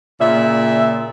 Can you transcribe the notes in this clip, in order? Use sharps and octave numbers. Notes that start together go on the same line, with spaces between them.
A#2 C#3 D5 E5